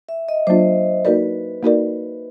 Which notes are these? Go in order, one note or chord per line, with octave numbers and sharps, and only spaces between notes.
E5
D#5
F#3 A#3 D4 F4 C5
A#3 D#4 F#4 A#4 B4 D5
A#3 D#4 F#4 A#4 D5